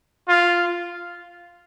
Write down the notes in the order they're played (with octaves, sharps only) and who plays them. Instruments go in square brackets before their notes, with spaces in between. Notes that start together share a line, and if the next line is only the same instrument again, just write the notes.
[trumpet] F4